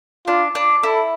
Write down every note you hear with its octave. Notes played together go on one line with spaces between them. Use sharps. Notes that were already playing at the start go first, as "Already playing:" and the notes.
D4 F4
D4
E4 A4